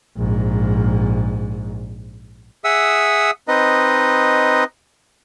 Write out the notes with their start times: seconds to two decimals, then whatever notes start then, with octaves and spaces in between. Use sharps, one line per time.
0.17 A#1 G#2
2.64 G#4 E5 F#5 D#6 E6
3.48 C4 D#4 B4 D#5